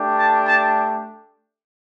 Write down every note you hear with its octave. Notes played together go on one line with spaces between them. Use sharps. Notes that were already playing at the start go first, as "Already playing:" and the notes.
Already playing: A3 D4 G4
A5
A5